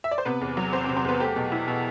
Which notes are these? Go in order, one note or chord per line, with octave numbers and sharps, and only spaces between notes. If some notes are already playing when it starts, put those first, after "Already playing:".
E5
D5
C5
C3 B3 B4
E2
F#3
E2 C4 C5
C4 C5
C3
C4 C5
E2 B3 B4
A3 G4
B2
E4
B2